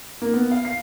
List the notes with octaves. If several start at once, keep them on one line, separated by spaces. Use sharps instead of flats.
A#3
B3
F5
C7